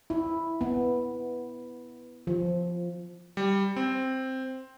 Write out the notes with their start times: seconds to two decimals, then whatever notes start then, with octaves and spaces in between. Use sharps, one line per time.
0.10 E4
0.61 B3
2.27 F3
3.37 G3
3.76 C4